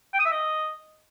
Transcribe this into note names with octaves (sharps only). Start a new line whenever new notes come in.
G5
D#6
E5
D#5